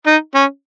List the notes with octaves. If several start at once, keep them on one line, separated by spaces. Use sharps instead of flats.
D#4
C#4